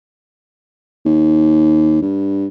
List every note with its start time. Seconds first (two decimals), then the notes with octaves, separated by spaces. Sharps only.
1.05 D#2
2.02 G2